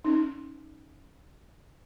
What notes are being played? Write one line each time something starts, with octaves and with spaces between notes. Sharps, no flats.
C#4 D#4